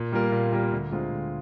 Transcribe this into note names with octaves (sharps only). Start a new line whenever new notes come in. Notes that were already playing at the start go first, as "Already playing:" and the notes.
Already playing: A#2
G3 A#3 F4 A#4
A#2
G3 A#3 F4 A#4
D2
D3 G#3 C4 F4
D2